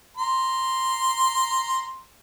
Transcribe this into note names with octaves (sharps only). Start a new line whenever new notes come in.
A#5 C6